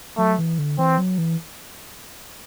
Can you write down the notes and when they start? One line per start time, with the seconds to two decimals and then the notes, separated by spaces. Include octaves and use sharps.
0.18 F#3 A3
0.38 E3
0.58 D3
0.78 E3 C4
0.98 F#3
1.18 E3